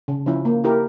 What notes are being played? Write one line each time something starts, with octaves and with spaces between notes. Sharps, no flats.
C#3
F3 C#4 E4
A#3
E4 G4 A#4